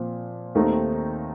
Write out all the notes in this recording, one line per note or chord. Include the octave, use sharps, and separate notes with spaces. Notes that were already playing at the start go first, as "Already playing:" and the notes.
Already playing: A#2 F3 C4
D#2 D#3 A3 C4 D#4